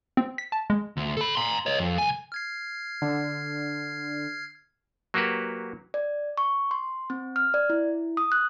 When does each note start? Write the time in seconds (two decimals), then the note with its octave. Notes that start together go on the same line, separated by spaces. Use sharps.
0.17 C4
0.38 B6
0.52 A5
0.70 G#3
0.97 D2
1.17 A4 B5
1.35 A#5 C6
1.66 C#5 D#5
1.79 F2
1.98 C2 G#5
2.32 F6 G#6 C7
3.02 D3
5.14 F#3 A#3 F#4 G4 B4
5.94 D5
6.37 C#6
6.71 C6
7.10 C4
7.36 F6
7.54 D5
7.70 E4
8.17 D#6
8.32 F#6